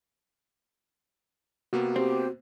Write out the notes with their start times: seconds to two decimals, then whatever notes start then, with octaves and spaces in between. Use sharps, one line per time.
1.73 C3 A#3 B3 F#4
1.96 C4 G4